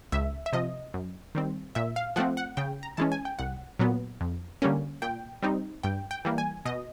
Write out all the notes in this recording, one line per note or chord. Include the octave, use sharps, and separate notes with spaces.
C#2 E5
E5
C3 F3 D#5
F#2
D#3 G3 C4
A#2 E5
F5
F3 A3 C4 F#5
F#5
C#3 G5
A#5
E3 G#3 C#4 A5
G#5
G5
C2 F#5
A#2 F#3 B3
F2
D3 G3 A#3 C#4
A#2 G5
G3 C4 D#4
G2 G5
G5
E3 G3 A#3
G#5
B2 D#5